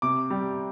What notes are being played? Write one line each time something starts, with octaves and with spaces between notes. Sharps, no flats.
C3 D6
G3